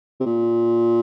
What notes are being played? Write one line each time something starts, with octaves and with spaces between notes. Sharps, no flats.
C3
A#2